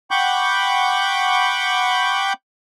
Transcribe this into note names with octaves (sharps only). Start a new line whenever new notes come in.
F#5 G5 B5 C#6 D6 G6